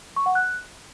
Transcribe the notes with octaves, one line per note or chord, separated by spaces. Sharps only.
C#6
F#5
F#6